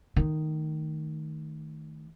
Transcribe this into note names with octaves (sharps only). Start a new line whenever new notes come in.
D#3 A3